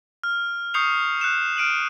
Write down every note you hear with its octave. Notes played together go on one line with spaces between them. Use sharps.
F6
C#6 D#6 G6 C7 C#7 F7
F6 F#6 C#7 E7
F6 D7 D#7 F#7